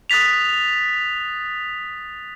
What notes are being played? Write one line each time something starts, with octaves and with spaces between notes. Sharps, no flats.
D#6 F#6 A6 B6 F7